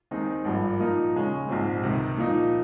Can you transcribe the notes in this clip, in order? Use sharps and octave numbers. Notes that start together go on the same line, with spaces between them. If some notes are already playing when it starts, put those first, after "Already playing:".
D#2 D#3 G#3 C4 D#4
G#1 G2 F3 A#3
A#2 F3 A#3 D#4 A#4
D#2 C#3 G#3 C#4
A#1 G#2 F3 C4
C#2 C3 D#3
A#2 F3 A#3 D#4